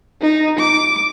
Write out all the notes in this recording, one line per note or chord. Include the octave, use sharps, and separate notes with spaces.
D#4
D6